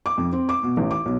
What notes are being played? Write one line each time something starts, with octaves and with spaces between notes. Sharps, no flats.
D6
F2
C4
D6
B2
A1
D6
B1